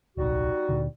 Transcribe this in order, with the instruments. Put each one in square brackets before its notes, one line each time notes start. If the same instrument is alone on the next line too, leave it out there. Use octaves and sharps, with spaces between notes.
[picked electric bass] D1 B1 [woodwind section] G3 D#4 F#4
[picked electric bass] D2 A#2 D3